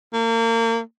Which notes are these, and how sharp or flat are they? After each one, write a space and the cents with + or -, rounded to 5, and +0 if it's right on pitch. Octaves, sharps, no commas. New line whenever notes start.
A#3 -35